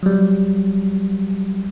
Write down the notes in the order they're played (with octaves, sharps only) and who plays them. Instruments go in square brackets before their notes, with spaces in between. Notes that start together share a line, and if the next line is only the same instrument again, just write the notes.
[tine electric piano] F#3 G3